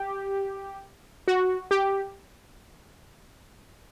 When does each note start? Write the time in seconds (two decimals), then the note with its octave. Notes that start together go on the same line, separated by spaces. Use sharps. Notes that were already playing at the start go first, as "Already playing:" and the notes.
Already playing: G4
1.28 F#4
1.71 G4